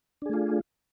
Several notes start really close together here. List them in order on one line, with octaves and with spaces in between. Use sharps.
D4 G#4 A3 F4